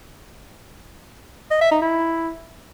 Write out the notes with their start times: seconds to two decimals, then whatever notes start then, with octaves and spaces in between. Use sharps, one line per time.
1.51 D#5
1.61 E5
1.71 D#4
1.81 E4